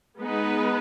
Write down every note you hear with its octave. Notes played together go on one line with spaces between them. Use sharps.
G#3 B3 D#4 B4